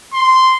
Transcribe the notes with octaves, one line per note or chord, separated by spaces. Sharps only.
C6